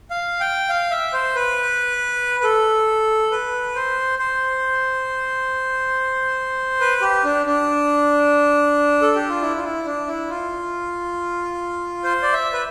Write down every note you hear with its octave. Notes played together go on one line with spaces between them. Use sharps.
F5
G5
F5
E5
C5
B4
B4
A4
B4
C5
C5
B4
G4
D4
D4
A4
G4
F4
E4
F4
E4
D4
E4
F4
C5
D5
E5
B4